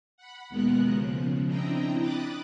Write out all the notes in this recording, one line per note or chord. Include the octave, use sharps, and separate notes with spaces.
F#5 B5
D#2 B2 G#3 B3 A#4 F#6
C#3 F3
C4 D4 E4 D#5 G5 A#5
B5 D6 D#6 F#6 A6